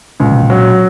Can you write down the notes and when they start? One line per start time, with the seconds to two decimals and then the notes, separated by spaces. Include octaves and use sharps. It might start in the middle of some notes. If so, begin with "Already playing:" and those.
0.20 C#2 A#2
0.32 B2
0.42 A#2
0.50 F#3